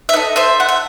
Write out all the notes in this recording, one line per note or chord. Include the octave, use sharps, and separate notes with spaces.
E5
D#4 A4 B4 D#5
C5 E5
F#5
E5